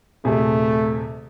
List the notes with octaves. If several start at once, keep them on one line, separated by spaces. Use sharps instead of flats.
D#1 C3 A3 G#4